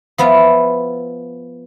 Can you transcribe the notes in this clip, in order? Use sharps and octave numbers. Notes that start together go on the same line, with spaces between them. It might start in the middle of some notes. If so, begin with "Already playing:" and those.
F3 B3 E4 F4